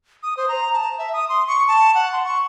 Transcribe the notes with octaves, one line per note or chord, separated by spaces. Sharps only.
D#6
C5
A#5
A5
E5
D#6
C6
C#6
A5
F#5
C6
C#6